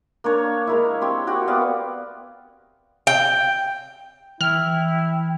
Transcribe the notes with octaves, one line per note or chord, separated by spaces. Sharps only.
A#3 D4 C#5
G#3 A#3 E4
C4 G4 C#5
F#4 G4 F#5
B3 D5 F5
G5
E3 E4 G5 F6